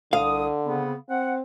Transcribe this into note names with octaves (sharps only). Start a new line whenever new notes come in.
C2 D3 F5 D#6
C#3 B3 C4
C4 F#5